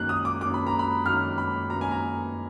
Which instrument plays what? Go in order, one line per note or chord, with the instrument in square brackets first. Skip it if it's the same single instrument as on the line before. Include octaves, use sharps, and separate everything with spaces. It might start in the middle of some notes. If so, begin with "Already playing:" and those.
Already playing: [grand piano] F#2 D#3 A#3 F#6
D#6
D6
F#2 D#3 A#3 D6
B5
A#5
B5
F#2 D#3 A#3 F6
B5
F#2 D#3 A#3 A#5
G#5
A#5